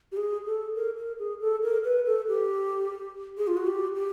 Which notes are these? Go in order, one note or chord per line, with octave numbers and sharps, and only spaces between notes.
G4
G#4
A4
A#4
A#4
G#4
A4
A#4
B4
A4
G4
G#4
F4
F#4
G4
G4